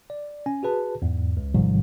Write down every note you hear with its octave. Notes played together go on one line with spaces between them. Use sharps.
D5
C#4 G#5
F#4 G#4 B4 A5
E2 G#2
C#2
A1 G#2 C3 D#3 F3 G3